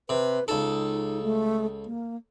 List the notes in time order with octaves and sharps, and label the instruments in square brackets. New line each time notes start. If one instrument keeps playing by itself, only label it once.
[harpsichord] C3 [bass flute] B4
[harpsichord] C#2 A4 [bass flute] D#4
[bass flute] A3
A#3